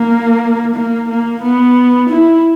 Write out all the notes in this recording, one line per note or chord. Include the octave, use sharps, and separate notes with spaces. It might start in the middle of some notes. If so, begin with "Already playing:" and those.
Already playing: A#3
A#3
A#3
B3
E4